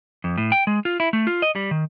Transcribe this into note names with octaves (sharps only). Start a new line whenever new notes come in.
F2
A2
G5
G#3
F4
E4
A3
F4
D#5
G3
D#3